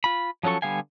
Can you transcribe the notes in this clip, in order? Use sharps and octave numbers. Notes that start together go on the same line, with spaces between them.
F4 B5
F3 F#3 C#4 A4 C#6
D3 G3 B3 F5 G#5